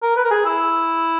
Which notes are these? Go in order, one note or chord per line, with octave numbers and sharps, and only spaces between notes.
A#4
B4
A#4
G#4
E4